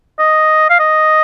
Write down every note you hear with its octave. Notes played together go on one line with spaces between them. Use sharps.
D#5
F5
D#5